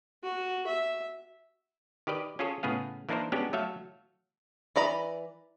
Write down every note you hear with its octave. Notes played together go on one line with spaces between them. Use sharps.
F#4
E5
D#3 G4 B4 D5 D#5
C#4 F4 G#4 A4 C#5
A2 C#3 B3 G#4 F5
E3 A#3 D4 D#4 A#4 C5
G#3 B3 C#4 D4 F#4 G4
F#3 A3 A4 E5 F5
E3 D5 A#5 B5